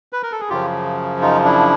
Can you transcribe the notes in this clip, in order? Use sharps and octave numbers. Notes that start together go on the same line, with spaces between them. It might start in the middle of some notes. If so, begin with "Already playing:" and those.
B4
A#4
A4
G#4
F#2 C#3 F3 F4 G4
D#4 F4
D4 E4